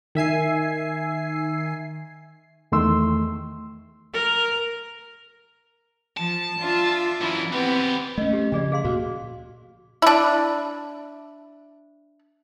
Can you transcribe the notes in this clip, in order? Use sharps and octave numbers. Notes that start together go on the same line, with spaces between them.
D#3 E5 G#5 C7
E2 D#3 A3 C6 E6
A#4
F3 A5
D4 F4 E5
F#2 E3 E4
E3 B3 C4 G4
A3 C#4 D#5
G4
C#3 F3 D4 G#4 D5
G#4 F5 C6
D2 A#2 F#4
D4 E4